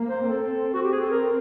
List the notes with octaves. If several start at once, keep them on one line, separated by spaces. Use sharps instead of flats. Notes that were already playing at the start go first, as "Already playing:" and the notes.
Already playing: A#3
C5
C4 A4
F#4
G4
G#4
A4
A#4